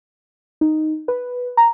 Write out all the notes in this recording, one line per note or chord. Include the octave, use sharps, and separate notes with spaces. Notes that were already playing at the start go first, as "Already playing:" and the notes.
D#4
B4
A#5